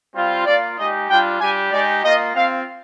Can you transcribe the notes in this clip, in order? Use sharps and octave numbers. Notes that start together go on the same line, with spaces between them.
G3 C4 F4
A#3 F4 D5
G#3 D#4 G4 D#5
G3 D4 F4 G5
G3 D4 G4 G#5
G#3 D#4 G4 D5
A#3 F4 D#5
C4 F4 F5